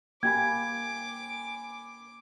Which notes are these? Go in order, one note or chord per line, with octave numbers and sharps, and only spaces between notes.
A#3 G4 G5 G#5 B5 D6 G#6